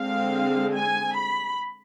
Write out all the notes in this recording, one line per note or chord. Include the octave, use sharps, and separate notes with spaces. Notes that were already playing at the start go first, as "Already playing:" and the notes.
Already playing: D3 G#3 C4 F5
G#5
B5